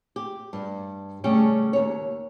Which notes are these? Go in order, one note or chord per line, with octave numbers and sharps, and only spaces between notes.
G4
G2
C#3 G3 A3 C#4 A4 G5
D#2 C#5